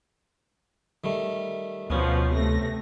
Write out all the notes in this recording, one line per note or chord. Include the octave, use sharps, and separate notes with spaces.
D#3 G3 A3
D2 B2 F3 B3 C#4
C3 A3 A#6